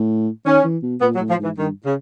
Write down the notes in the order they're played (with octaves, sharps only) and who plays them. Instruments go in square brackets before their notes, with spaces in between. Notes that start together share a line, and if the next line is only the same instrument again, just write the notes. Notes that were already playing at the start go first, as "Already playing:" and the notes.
Already playing: [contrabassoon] A2
[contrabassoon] D#3 [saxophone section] C#4
[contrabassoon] E3
B2
[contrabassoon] A#2 [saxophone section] B3
[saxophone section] F#3
[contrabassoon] A2
[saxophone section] F3
[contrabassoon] G#2 [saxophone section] E3
[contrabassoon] G2 [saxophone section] D#3
[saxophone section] C#3